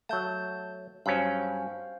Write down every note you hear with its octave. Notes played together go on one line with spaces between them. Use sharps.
F#3 A3 A5 G6
G2 F#3 C#4 C5 F5